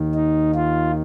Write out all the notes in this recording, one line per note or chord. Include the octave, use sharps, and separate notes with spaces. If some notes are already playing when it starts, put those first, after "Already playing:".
Already playing: D#2 D#3
D#4
F4